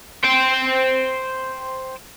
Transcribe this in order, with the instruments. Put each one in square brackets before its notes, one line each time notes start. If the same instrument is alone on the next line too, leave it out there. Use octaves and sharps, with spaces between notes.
[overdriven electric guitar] C5 G5